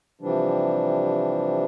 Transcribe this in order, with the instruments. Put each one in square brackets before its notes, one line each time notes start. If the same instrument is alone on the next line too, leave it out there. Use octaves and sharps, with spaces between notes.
[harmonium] C3 E3 F3 G3 D4